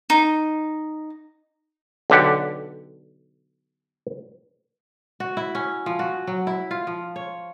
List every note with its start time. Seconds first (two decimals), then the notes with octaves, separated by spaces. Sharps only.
0.10 D#4
2.10 B1 D3 G4 F#5
5.20 F#4
5.37 E4
5.55 C#4
5.86 F3
5.99 F#4
6.27 F#3
6.47 E4
6.71 F4
6.87 F3
7.16 C#5